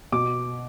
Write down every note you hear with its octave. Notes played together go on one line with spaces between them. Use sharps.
B2 D6